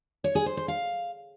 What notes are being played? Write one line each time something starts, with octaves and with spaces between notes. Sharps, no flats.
C#5
G#4
C5
C5
F5